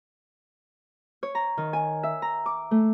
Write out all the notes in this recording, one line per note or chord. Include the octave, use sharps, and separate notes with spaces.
C#5
A#5
D#3
G#5
E5
A#5
D6
A3